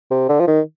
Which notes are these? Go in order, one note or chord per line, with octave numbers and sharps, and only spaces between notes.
C3
D3
F3
D#3